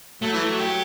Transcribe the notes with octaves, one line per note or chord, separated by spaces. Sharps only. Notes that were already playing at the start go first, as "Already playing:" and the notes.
F#3 A3
E3
F#3
G4